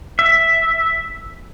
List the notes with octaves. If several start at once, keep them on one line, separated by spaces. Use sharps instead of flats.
E5